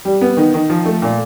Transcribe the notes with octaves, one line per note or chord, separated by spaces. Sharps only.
G3
B3
D#3
D#3
F3
A3
A#2